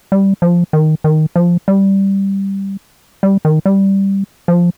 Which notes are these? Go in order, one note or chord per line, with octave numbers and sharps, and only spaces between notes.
G3
F3
D#3
D#3
F3
G3
G3
D#3
G3
F3